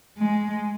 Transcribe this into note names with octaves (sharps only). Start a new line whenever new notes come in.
G#3